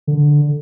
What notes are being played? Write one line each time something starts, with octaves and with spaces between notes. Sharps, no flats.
D3